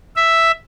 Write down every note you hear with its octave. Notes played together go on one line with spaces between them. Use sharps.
E5